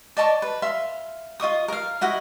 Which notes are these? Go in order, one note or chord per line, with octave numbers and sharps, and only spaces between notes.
D5 D#5 A5 C#6
B4
E5 F5 C6
F4 D#5 C#6 D#6
A#4 F5
E4 F#4 D#5 F#5